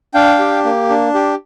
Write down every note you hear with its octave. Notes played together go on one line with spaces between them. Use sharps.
D4 F5 G5
G4
A#3
D4
G4